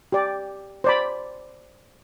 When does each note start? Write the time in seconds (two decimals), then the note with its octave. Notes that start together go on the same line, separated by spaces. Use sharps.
0.12 G4 D5
0.84 C5 D5 B5